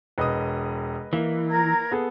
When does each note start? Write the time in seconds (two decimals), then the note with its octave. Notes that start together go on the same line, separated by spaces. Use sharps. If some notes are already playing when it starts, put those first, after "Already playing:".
0.18 E1 B4 D#5 D#6
1.13 E3 A#3
1.50 A#4 A#5 G#6
1.91 B3 G#4 A4